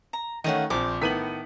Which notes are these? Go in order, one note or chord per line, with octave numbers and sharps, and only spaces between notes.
A#5
D#3 A3 C#4 D#5 F5 F#5
A#1 F3 C4 D6
A2 D#3 B3 B6 D#7 F#7